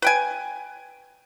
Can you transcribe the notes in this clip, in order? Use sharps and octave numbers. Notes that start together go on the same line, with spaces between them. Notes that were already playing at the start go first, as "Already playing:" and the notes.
B4 G5 G#5